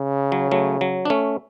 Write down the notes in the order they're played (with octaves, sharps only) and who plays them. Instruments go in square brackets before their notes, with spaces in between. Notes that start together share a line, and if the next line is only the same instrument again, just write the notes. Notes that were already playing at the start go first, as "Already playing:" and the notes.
Already playing: [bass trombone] C#3
[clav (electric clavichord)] F#3
F#3 A3
F#3
D4
A3 C#4